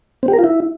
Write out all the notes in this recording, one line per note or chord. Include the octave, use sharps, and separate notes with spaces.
C4
G4
A#4
F4
E4